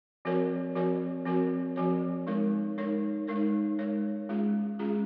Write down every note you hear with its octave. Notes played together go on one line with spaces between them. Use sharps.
F3 C4 F#4 A#4 C#5
F3 C4 F#4 A#4 C#5
F3 C4 F#4 A#4 C#5
F3 C4 F#4 A#4 C#5
G#3 D#4 A#4 C#5
G#3 D#4 A#4 C#5
G#3 D#4 A#4 C#5
G#3 D#4 A#4 C#5
G#3 C#4 F4 G#4
G#3 C#4 F4 G#4